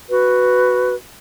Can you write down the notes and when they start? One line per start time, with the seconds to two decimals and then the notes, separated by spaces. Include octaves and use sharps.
0.10 F#4 B4